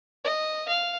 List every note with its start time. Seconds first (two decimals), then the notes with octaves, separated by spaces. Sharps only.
0.25 D#5
0.68 F5